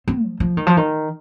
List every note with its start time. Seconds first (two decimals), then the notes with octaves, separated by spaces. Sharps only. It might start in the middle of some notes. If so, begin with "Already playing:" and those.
0.08 C4
0.24 F3
0.40 F3
0.57 D#3
0.67 F3
0.77 D#3